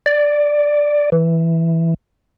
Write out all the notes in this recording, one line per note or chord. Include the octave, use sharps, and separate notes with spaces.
D5
E3